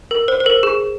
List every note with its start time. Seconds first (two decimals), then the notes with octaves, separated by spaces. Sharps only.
0.11 A#4
0.28 C5
0.40 C5
0.46 A#4
0.63 G#4